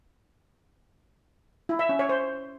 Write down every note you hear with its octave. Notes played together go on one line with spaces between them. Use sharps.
E4
E5
C#4
C#5
C5